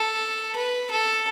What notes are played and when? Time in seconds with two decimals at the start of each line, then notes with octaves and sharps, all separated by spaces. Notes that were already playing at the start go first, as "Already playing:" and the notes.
Already playing: A4
0.56 B4
0.91 A4